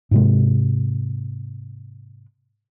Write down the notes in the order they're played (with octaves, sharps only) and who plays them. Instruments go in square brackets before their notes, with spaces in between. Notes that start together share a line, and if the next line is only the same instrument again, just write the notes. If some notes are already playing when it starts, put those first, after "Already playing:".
[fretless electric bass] G#2 C3 G#3